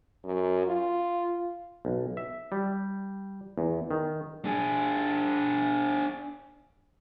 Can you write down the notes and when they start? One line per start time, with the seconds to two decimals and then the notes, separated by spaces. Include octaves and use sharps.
0.24 F#2
0.67 F4
1.85 B1
2.17 E5
2.52 G3
3.58 E2
3.91 D#3
4.45 D4 G#4